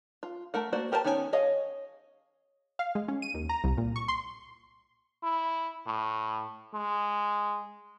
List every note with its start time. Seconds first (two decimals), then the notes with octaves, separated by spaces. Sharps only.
0.23 F4
0.54 A3 A#4 F#5
0.73 A#3 F#4 C5 D5
0.92 G4 A#4 C5 D#5 A5
1.05 D#3 B3 C#4 D4 G#5
1.33 G#4 C#5 D#5 F5
2.79 F5
2.95 G#3
3.08 C#4
3.22 D#7
3.34 D#2
3.49 A#5
3.64 C2
3.77 A#2
3.96 C#6
4.08 C6
5.23 E4
5.87 A2
6.74 G#3